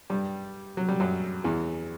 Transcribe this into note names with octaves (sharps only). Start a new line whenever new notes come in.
G2 G3
F#3
G3
F#2 F#3
E2 E3